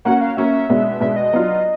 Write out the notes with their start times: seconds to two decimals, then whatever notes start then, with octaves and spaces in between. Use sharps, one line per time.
0.05 A#3 C#4 F#4 F#5
0.21 F5
0.37 A#3 C#4 F#4 E5
0.69 B2 G#3 B3 D4
1.00 B2 G#3 B3 D4 E5
1.16 D#5
1.33 F#3 B3 D4 F4